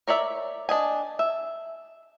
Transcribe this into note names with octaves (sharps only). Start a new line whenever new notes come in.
A#4 C#5 D5 E5
D4 D#5 G#5
E5